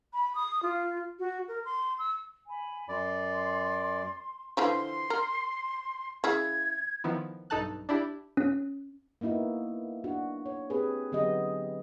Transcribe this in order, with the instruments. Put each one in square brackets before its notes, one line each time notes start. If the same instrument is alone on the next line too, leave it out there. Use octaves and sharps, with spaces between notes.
[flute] B5
D#6
F4
F#4
A#4
C6
E6
[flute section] G#5 B5
[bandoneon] F#2 D5 [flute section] C6
[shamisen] D3 E3 F3 [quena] C6
[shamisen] A#4
[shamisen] C#3 E4 G#4 [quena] G#6
[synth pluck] D#3 F3 B3 E4
B1 G2 D#4 A4 A5 F#6
D4 E4 G4
[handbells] C#4
[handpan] A#3 B3 D#4 E4 F#4
D4 F#4
C#5
C4 G4 G#4 B4
D3 F#3 B3 G4 G#4 D#5